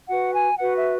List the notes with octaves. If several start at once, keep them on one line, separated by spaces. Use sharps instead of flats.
F#4 B4 F#5
G#5
F#4 B4 F#5
E5